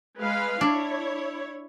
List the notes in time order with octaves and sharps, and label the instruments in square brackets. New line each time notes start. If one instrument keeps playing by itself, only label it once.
[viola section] G#3 B4 F5
[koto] D4 [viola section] E4 C#5